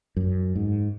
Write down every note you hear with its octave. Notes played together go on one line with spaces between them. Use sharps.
F#2
G#2